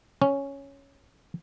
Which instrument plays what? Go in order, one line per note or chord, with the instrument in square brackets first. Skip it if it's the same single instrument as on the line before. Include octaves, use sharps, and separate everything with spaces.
[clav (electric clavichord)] C#4